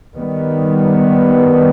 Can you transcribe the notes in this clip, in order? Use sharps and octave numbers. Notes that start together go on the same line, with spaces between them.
D#3 G3 B3